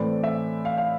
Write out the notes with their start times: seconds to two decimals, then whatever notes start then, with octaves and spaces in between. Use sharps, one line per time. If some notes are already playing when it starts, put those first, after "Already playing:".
Already playing: A2 E3 A3 C4 D5
0.23 E5
0.65 F5
0.78 F5